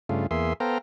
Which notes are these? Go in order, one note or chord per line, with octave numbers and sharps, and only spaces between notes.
G2 C#3 A3 F4
E2 A#3 G#4 E5 C6
B3 A4 C5 F5 G5 A#5